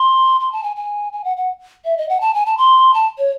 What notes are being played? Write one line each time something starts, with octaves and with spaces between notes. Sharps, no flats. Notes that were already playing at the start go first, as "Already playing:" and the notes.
Already playing: C6
C6
A5
G#5
G#5
G#5
F#5
F#5
E5
D#5
F#5
A5
G#5
A5
C6
A5
C#5